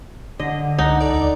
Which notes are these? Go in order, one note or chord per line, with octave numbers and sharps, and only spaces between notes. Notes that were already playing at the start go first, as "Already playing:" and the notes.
D3 D#5
C#2 D#4 F#5
A4 D5
D#2